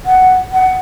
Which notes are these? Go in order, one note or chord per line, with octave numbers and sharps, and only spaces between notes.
F#5
F#5